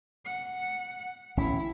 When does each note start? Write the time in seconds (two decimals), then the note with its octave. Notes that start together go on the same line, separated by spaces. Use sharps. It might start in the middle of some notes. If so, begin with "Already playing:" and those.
0.25 F#5
1.37 A1 D2 C#4 E4